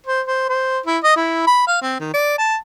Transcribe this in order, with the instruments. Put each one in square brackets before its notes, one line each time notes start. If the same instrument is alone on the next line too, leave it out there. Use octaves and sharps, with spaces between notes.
[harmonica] C5
C5
C5
E4
D#5
E4
B5
F5
C4
D#3
D5
A5